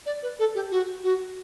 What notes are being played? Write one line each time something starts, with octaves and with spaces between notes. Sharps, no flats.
D5
B4
A4
G4
F#4
F#4